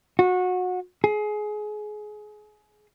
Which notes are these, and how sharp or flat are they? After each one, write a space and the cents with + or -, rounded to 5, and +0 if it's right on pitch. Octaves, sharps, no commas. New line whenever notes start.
F#4 -25
G#4 +25